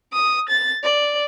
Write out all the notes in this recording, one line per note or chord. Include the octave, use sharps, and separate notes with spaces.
D#6
A6
D5